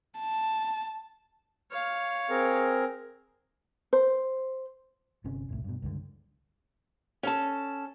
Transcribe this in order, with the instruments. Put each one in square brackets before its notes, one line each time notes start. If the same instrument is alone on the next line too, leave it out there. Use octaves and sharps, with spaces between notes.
[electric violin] A5
[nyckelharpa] C#5 F5 [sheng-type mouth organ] F6
[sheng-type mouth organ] C4 G#4 A#4
[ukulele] C5
[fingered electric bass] G1 C3 C#4
D#1 C2 A2
G2 B2
C#2 G2 D3
[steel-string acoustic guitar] C#4 A4 A5